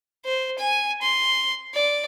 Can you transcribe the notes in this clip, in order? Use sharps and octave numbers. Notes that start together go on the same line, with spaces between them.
C5
G#5
C6
D5